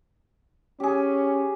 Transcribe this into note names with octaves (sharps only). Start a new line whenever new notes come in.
C#4 G4 G#4